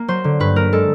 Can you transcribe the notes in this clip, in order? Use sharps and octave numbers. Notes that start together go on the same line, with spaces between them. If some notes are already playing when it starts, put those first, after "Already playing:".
Already playing: A#3
F#3 C5
D3
G2 B4
A#3 A#4
G#3 A4